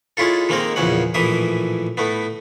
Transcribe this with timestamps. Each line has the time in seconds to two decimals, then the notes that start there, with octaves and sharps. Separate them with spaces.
0.17 G#3 C#4 E4 F4 A4
0.49 D#3 G#3 A#3 C4 A#4
0.76 A#1 E2 C#3 C#4 F#5
1.14 A#1 A2 E3 E5 D#6
1.97 A2 A3 B3